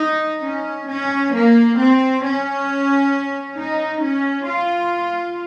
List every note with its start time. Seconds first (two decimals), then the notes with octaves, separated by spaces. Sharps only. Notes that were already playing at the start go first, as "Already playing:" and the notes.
Already playing: D#4
0.44 C#4
0.89 C#4
1.34 A#3
1.79 C4
2.23 C#4
3.58 D#4
4.02 C#4
4.47 F4